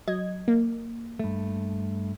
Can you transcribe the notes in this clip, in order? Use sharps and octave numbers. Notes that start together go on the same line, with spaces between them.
F#3 D#5 G#6
A#3
G2 A3